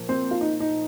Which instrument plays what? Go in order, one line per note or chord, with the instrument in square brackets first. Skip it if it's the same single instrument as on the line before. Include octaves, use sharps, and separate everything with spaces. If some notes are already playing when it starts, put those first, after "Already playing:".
Already playing: [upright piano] A#2 F3 A#3
C4 C5
F4
D#4
D#4